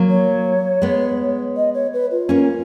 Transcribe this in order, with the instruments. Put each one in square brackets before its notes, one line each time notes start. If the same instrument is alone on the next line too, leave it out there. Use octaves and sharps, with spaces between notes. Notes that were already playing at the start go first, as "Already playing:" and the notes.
Already playing: [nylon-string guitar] F#3 A#3
[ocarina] C#5
[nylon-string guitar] G#3 B3
[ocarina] D#5
C#5
B4
F4
[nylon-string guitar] A#3 C#4